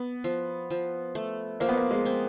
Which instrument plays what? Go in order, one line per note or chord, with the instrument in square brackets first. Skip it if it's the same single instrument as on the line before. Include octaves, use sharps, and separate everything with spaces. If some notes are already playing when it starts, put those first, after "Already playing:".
Already playing: [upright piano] B3
[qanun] F3
F3
A3
[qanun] F3 [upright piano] A#3
[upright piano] B3
A#3
G#3
[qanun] C4